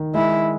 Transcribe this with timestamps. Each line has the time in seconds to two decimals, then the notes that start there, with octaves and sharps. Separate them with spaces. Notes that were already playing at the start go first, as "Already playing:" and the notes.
Already playing: D#3
0.14 G#3 E4